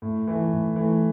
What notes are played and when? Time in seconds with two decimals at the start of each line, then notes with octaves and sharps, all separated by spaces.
0.02 A2
0.27 E3 A3
0.52 A2
0.76 E3 A3